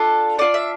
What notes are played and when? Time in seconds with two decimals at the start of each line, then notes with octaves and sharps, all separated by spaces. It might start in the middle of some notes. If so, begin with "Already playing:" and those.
Already playing: D4 F4 A4
0.38 D4 F4 A4 D5
0.54 E5